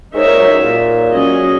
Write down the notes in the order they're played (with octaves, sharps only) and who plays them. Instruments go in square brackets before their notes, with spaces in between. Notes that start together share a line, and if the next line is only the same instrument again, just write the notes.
[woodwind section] G#2 G#3 [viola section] D#4 A#4 C#5 E5
[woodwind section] A#2 A#3
F#2 F#3
C#2 C#3
A#2
[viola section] F#3 C#4 G#4 D#5